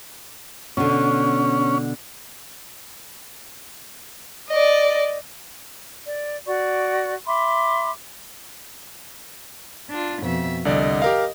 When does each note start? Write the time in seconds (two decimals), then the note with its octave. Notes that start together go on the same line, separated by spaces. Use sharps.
0.77 B2 D3 C#4
4.49 D5 D#5
6.05 D5
6.47 F#4 D5 C#6
7.26 E5 B5 C6 D6
9.90 D4 F4
10.22 F2 B2 E5
10.65 C2 D3 D5 D#5
11.02 G4 A#4 F5